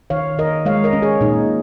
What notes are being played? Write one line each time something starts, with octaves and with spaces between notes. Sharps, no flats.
D#3 C#5 F5
D#3 A#4 D#5
G#3 C#5 F5
A#4 D#5
C#4
G#4 C#5
A#2 D#4